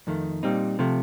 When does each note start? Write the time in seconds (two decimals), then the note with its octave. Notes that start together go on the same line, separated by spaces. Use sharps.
0.07 F2 D#3 A3
0.43 A#2 G3 C4 D#4
0.79 C3 F3 A3